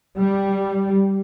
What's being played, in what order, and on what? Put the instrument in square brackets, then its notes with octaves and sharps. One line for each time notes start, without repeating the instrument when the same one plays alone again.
[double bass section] G3